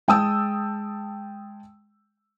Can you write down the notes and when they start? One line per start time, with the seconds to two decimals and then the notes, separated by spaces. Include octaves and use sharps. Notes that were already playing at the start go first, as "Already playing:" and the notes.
0.08 G#3 G5 A5 D#6 E6